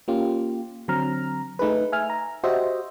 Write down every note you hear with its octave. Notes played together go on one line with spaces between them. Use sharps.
A#3 C#4 F4 G4
D3 F#3 C4 A#5 F6
A3 D#4 G#4 B4
E5 G#5 F6
A#5
F#4 G4 C5 D#5 E5